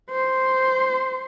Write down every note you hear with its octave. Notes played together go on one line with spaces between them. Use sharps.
C5